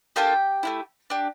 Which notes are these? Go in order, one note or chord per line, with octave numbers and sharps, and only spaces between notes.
A#3 D4 F4 G4 A4 G5
A3 C#4 E4
D4 G4